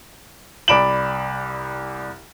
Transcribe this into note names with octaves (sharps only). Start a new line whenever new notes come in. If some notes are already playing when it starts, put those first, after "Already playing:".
C2 D5 B5 D7 E7 F#7